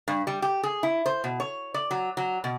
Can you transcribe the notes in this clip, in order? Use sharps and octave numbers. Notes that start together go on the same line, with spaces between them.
G2
G3
G4
G#4
E4
C5
B2
C#5
D5
F#3
F#3
B2